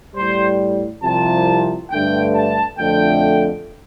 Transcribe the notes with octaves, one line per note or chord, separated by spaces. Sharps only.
A2 G3 C5
C2 C3 F3 A5
G2 D3 A3 G5
A5
F2 D3 A3 G5